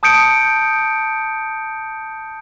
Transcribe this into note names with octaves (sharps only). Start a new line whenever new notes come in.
A5 D#6 G6 C#7 D7